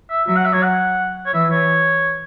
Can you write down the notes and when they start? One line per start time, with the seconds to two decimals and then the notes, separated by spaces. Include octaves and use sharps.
0.10 E5
0.27 F#3 E5
0.36 F#5
0.45 E5
0.53 C#5
0.63 F#5
1.26 C#5
1.33 E3 E5
1.51 C#5